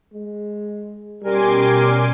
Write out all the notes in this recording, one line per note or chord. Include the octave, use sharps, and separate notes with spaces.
G#3
B2 G3 C#4 A#4 G5 G#5 C6 D6